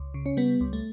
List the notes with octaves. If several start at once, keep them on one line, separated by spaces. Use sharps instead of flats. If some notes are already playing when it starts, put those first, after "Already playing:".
Already playing: C#2
C#3
C#4
G3 B3
C#2
A3